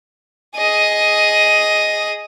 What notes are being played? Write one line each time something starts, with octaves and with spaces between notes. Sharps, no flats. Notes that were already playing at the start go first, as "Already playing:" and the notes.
G#4 D#5